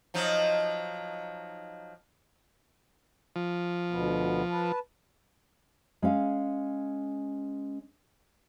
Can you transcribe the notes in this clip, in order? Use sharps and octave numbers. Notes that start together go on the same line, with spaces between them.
F3 F#3 D#4
F3
D2 B2 B3
B4 A5
G#3 C#4 F5